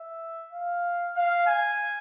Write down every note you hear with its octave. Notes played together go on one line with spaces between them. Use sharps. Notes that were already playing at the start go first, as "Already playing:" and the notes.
Already playing: E5
F5
F5
G#5